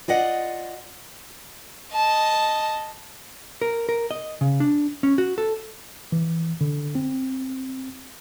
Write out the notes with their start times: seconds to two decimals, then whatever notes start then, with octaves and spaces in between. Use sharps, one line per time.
0.08 F4 D5 D#5 F#5
1.93 D#5 A5
3.62 A#4
3.89 A#4
4.11 D#5
4.41 C#3
4.60 D4
5.03 C#4
5.18 F#4
5.38 A4
6.12 E3
6.61 D3
6.95 C4